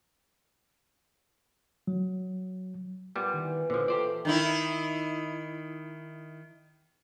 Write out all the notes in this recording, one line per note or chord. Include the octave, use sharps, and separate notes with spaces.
F#3
A#2 G3 B3
D#3 E3
A#2 D3 F3 A#3 C5
F4 G4 A4 C5 D5
D#3 D#4 E4